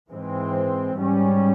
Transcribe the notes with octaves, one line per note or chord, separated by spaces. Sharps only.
G#2 E3 G#3 C4
G#2 G3 C#4